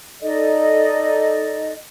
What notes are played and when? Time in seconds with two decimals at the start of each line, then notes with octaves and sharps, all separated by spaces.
0.21 D#4 A4 D5 D#5